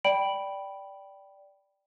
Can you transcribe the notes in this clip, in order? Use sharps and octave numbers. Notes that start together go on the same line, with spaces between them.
D5 G5 B5 D7 F#7